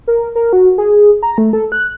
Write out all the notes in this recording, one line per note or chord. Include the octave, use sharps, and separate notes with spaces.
A#4
A#4
F#4
G#4
A#5
A3
A4
F#6